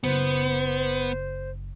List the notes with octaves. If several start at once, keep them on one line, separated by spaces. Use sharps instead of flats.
F#1 B3 C5